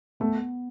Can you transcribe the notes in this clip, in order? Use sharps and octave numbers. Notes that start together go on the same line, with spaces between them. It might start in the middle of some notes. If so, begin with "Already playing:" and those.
A3 B3